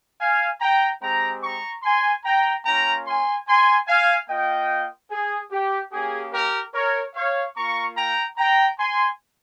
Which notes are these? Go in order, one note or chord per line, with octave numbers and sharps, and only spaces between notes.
F5 G#5
G5 A#5
G#3 C4 G4 G5 A#5
A#5 C#6
G#5 C6
G5 A#5
A#3 C#4 F4 G5 A#5
G#5 C6
G#5 C6
F5 G#5
A#3 F4 D#5 G5
G#4
G4
A#3 C#4 G4 G#4
G4 A#4
A#4 C#5
C#5 F5
A#3 F4 A#5 C#6
G5 A#5
G5 A#5
G#5 C6